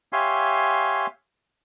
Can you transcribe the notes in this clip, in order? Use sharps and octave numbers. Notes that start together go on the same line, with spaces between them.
G4 C#5 E5 F5 G#5 C6